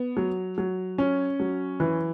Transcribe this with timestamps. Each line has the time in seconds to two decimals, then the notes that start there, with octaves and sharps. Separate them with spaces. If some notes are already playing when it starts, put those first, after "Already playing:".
Already playing: B3
0.17 F#3
0.58 F#3
0.98 C#4
1.40 F#3
1.80 E3